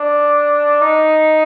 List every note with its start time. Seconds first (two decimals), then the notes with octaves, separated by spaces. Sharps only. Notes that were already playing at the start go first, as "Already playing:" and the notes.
Already playing: D4
0.81 D#4